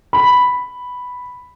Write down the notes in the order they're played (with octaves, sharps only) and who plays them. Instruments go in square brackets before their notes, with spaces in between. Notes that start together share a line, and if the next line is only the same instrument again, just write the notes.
[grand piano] B5